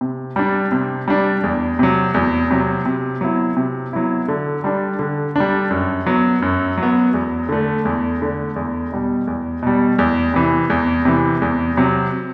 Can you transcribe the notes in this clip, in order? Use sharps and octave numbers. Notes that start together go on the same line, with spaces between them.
C3
G3 D4
C3
G3 D4
E2
C3 F#3
E2
C3 F#3
C3
F#3 B3 E4
C3
F#3 B3 E4
D3
G3 D4
D3
G3 D4
F#2
F#3 B3
F#2
F#3
B3
E2
D3 A3
E2
D3 A3
E2
B2 G3
E2
B2 G3
E2
C3 E3
E2
C3 E3
E2
C3 F#3